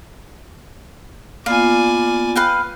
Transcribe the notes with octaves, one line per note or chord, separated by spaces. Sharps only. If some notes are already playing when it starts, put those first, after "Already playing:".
A#3 B3 F4 D5 F5 G#5
B4 F5 G5